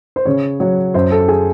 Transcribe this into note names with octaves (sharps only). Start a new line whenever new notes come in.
C5
C#3 C#5
F#3 C#5
F#2 C5
A4
G#4